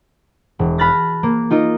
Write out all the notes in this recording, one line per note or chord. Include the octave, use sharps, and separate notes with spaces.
E1
A5 B5 F6 F#6 A6 A#6
A#3
D#4 F4 A#4 D#5